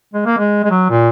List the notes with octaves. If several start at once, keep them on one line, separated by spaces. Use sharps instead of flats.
G#3
A#3
G#3
G#3
F#3
A#2